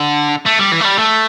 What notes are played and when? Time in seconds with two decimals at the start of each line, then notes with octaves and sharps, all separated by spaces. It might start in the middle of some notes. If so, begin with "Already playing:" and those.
Already playing: D3
0.46 A3
0.59 G3
0.72 E3
0.81 A3
0.85 G3
0.99 A3